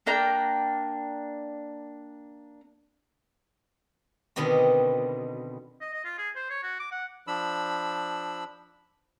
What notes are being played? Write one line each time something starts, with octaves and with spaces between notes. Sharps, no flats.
A#3 D4 G5 A#5
B2 D3 D#3 C4
D#5
D#5
F4
G#4
C5
C#5
F#4
D6
F#5
F3 D4 B5 E6